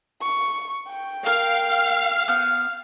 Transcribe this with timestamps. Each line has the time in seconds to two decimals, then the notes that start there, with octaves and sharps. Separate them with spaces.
0.21 C#6
0.89 G5
1.26 A#4 F5
2.28 B3 F6 G6